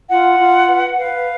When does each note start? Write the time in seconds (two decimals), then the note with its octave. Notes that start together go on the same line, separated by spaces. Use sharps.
0.09 F4 F#5
0.38 F4
0.68 B4
0.97 B4 F5